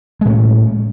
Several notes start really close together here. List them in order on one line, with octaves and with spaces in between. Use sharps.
G#3 A2 C#4